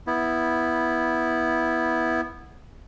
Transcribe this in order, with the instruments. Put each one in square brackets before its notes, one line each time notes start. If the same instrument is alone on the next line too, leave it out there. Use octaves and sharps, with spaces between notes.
[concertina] B3 E4